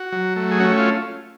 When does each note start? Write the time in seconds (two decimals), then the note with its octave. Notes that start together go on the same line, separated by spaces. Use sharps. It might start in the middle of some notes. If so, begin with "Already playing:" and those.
Already playing: F#4
0.12 F#3
0.36 A3
0.51 G#4
0.60 C#4 F#4
0.78 F4